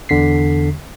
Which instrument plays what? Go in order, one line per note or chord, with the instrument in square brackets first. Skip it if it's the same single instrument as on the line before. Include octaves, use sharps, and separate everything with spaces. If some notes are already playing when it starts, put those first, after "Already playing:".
[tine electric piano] E2 D3 B6 C7